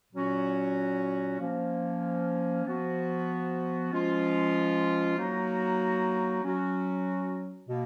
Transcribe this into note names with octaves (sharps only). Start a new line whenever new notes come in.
A#2 F#3 C#4 F#4
F3 A#3 C#4
F3 B3 F#4
F3 G#3 C#4 F4
F#3 A#3 D#4 F#4
F#3 C#4 F#4
B2 A#3